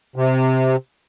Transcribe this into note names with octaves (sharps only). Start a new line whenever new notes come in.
C3